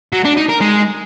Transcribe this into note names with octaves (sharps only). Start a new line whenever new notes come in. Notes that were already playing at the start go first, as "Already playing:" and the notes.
F#3
D4
D#4
A#4
G#3